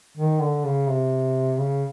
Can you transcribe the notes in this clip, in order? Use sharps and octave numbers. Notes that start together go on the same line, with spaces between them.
D#3
D3
C#3
C3
C#3